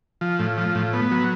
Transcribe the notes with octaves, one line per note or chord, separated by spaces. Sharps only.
F3
A2
F3
A2
B3
F#3